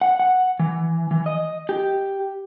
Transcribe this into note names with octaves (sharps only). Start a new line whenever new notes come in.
F#5
F#5
E3
E3
D#5
G4